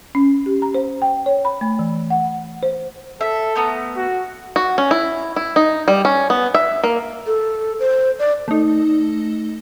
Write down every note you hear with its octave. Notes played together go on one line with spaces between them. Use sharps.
C#4
G4
A#5
C5
G5
C#5
B5
A3
E3
F#5
C5
A4 E5
A3 B3 A#5
F#4
F#4
C#4
E4
E4
D#4
G3
C#4
B3
E5
A#3
A4
C5
D5
A3 D#4